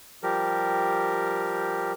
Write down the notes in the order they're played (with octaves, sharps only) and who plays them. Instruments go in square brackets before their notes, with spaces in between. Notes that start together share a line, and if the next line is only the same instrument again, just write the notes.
[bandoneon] F3 G3 G4 A#4